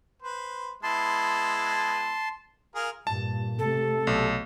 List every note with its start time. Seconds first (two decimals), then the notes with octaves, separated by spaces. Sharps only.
0.22 B4 C5
0.83 G#3 B3 E4 A5 C6
2.75 F4 G#4 A#4
3.07 G2 A#2 A5
3.59 C3 A3 A4
4.07 B1